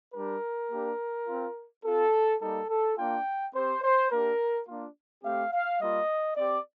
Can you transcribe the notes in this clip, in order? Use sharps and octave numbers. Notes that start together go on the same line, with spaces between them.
G3 D4 G4 A#4
A#3 D4 G4
C4 F4
C4 F4 A4
G3 A#3 D#4 A4
A4
A#3 D4 F4 G5
C4 G4 C5
C5
A#3 D4 G4 A#4
A#3 D4 F4
A3 C4 G4 F5
F5
G3 A#3 F4 D#5
C4 G4 D5